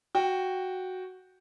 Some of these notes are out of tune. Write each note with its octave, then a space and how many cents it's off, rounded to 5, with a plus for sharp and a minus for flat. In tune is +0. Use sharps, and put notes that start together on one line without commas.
F#4 +0 G5 +0